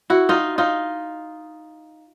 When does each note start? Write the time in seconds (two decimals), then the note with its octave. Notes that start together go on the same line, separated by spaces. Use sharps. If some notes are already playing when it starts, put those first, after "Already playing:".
0.10 E4 F#4
0.29 D#4 F4
0.58 D#4 F4